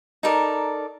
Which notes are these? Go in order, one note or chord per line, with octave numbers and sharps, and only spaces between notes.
D#4 A4 A#4 D5